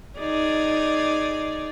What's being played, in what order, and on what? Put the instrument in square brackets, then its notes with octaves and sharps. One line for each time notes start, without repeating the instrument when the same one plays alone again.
[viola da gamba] D#4 G#4 D5